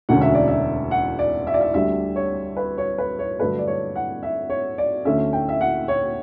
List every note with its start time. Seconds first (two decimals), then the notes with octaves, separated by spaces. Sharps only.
0.09 E1 D2 D3 F#3 C#4 F#5
0.21 E5
0.35 D5
0.48 E5
0.91 F#5
1.19 D5
1.47 E5
1.54 D5
1.61 E5
1.74 D2 D3 G3 D4 E5
2.16 C#5
2.57 B4
2.78 C#5
2.98 B4
3.19 C#5
3.40 G2 D3 F#3 A3 D4 B4
3.59 D5
3.67 C#5
3.96 F#5
4.23 E5
4.50 C#5
4.78 D5
5.05 D2 D3 A3 C#4 E5
5.33 G5
5.49 E5
5.61 F#5
5.88 C#5